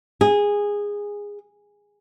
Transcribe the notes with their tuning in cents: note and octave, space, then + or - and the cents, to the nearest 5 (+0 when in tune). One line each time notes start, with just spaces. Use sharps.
G#4 -15